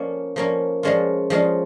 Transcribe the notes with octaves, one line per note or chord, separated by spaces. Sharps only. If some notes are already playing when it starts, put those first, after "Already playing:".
Already playing: F3 A#3 C#4
F3 A#3 C#4
F3 G#3 C#4 F4
F3 G#3 C#4 F4